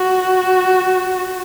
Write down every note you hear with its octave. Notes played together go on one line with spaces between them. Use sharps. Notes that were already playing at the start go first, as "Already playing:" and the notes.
Already playing: F#4